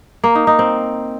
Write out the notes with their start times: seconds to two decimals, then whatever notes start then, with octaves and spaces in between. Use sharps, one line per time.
0.24 A#3
0.35 D#4
0.47 D#4
0.59 C4